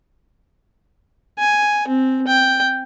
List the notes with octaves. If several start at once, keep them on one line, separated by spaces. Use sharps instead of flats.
G#5
C4
G5